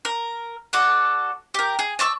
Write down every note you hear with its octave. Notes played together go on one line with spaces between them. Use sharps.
A#4
F#4 A4 D5 F#5
G4 A#4
G#4
D5 A5 C#6 E6